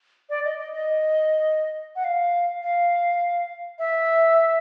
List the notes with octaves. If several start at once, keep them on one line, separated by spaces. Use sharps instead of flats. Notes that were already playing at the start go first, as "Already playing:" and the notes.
D5
D#5
D#5
D#5
F#5
F5
F5
E5